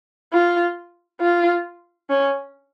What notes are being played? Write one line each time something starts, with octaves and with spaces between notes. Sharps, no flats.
F4
F4
C#4